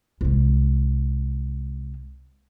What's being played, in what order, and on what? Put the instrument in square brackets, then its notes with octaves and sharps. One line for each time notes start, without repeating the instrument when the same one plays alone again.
[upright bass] C2 G#3